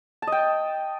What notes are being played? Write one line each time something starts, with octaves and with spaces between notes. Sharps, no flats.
A5
D#5
G5